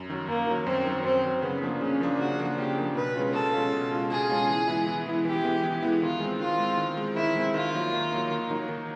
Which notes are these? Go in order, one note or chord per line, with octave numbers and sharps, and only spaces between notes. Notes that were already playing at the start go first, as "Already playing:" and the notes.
Already playing: F#2
D#3 F#3
F#2 A#3
D#3 F#3
F#2 C4
D#3 F#3
F#2 C4
D#3 F#3
C#3 B3
F3 A#3 D4
C#3 C#4
F3 A#3 D4
C#3 F#4
F3 A#3 D4
C#3 G4
F3 A#3 D4
B2 B4
G#3 C#4 F4
B2 A4
G#3 C#4 F4
B2
G#3 C#4 F4
B2 G#4
G#3 C#4 F4
E3
G#3 B3 E4
E3
G#3 B3 E4
E3 G4
G#3 B3 E4
E3
G#3 B3 E4
D#3 F4
G#3 C4
D#3 F4
G#3 C4
D#3
G#3 C4
D#3 E4
G#3 C4
D#3 F4
F#3 A#3 D#4
D#3
F#3 A#3 D#4
D#3
F#3 A#3 D#4
D#3